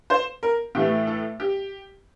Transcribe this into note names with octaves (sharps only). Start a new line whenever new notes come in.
C5
A#4
A2 E3 A3 G4
A4
G4